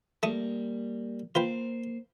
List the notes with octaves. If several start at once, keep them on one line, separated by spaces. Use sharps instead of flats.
G3 A3 A#3 C#6 D#6
A#3 F4 B4 C5 G5